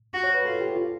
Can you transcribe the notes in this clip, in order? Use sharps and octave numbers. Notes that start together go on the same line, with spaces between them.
F#4
C#5
B4
F4 A4
G4
F4